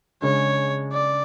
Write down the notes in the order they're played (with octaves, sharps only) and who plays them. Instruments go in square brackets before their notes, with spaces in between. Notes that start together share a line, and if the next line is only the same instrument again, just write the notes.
[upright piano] C#3 G#3 D4 [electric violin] C#5
[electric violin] D5